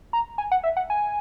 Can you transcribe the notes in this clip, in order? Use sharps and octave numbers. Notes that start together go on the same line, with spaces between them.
A#5
G#5
F#5
E5
F#5
G#5